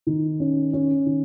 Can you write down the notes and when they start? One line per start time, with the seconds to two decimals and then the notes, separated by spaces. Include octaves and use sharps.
0.07 D#3
0.40 C#4
0.73 C#4
1.06 D#3